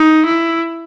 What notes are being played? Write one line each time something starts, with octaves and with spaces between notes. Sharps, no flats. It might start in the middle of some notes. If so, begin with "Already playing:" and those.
Already playing: D#4
E4